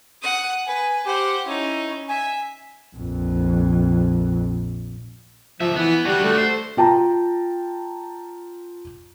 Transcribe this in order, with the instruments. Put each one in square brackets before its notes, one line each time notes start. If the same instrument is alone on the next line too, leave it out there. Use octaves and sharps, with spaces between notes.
[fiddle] F#5 D#6
[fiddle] B4 [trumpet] G#5
[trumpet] G4 [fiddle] C5 F#5
[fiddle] C#4 D#4 [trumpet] E4
[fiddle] E5 [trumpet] G#5
[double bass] A#1 F2
[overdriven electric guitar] D2 E5 [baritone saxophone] F3
[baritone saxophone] E3 [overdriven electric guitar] B3
[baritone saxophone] G3 [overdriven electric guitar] D4 F#4
[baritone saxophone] A3
[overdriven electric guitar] C5
[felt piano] F4 G5 A5 A#5